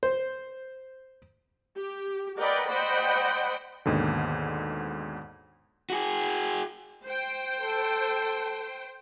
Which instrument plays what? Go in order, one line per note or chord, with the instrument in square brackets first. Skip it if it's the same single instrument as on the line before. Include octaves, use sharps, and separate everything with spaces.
[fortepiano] C5
[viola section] G4
A#4 B4 D5 D#5 F#5 G5
C5 D5 D#5 F#5 G5 B5
[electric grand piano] D#2 G#2 B2 D3
[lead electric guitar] F#4 G#4
[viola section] C5 G5
[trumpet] A4